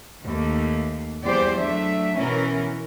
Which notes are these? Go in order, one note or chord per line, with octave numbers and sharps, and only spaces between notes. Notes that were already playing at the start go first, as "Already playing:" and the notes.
D#2 A3 A#3
E2 E3 G3 G4 C5 D5
F#3 A3 D4 E5
B2 E3 C#4 E4 A#4